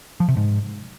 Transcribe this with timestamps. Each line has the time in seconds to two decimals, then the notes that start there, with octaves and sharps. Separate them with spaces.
0.20 F3
0.28 C3
0.37 G#2